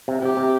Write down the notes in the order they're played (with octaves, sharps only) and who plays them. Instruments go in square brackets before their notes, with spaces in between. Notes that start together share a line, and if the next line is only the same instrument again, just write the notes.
[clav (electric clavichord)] C3
[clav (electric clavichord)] C3 [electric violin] G4
[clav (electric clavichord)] C3